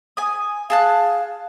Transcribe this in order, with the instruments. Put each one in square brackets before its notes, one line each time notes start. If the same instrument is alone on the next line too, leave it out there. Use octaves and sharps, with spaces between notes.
[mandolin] G#5 D#6
[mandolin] G#4 A5 F#6 [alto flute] F5